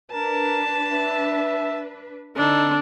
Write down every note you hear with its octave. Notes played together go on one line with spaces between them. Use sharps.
D4 A#4 B4 A5
E5
D3 C4 D4 D#4 A4